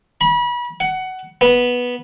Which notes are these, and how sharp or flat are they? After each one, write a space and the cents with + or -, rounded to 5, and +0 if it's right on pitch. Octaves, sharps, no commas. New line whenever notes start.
B5 -35
F#5 +15
B3 -10